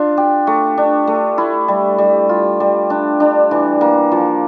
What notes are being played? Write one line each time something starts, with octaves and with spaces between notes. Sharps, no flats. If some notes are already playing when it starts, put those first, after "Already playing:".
Already playing: D4 F4
G4
A3
D4
A3
E4
G3
G3
F4
G3
D4
D4
E3
A#3
F3